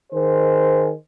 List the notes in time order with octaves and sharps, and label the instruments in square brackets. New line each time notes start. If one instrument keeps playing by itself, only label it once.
[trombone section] D#3 G#4 C5